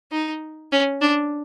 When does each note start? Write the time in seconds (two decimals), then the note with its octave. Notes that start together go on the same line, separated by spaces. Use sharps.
0.12 D#4
0.72 C#4
1.01 D4